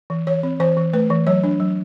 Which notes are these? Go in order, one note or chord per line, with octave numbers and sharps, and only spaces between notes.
E3
E3 C#5
C4
E3 C5
E3
A3 B4
E3
F#3 C#5
D4
F#3